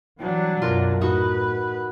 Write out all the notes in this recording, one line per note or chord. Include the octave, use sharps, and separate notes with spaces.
E3 F#3 G3 D4
C2 F#2 B2 F4 A#4
A2 D#4 F#4 B4